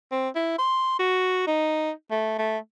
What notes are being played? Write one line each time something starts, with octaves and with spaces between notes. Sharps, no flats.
C4
E4
C6
F#4
D#4
A3
A3